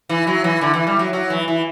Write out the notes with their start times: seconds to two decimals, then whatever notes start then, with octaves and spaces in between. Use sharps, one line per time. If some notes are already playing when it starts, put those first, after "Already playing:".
0.09 E3
0.27 F#3
0.44 E3
0.61 D3
0.74 E3
0.87 G3
0.99 F#3
1.13 F#3
1.30 E3
1.48 E3